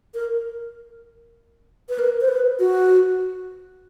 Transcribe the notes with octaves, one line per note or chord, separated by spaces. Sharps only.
A#4
B4
A#4
C5
B4
F#4